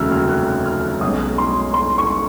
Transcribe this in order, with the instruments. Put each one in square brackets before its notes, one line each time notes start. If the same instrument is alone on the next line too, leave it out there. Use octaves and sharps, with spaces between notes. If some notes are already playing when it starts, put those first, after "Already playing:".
Already playing: [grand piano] F1 D#2 C#3 F#3 [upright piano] E6 F6
[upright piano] F6
F#6
F6
[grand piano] B1 B2 G#3 C#4 [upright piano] D#6
[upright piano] C6
C6
C#6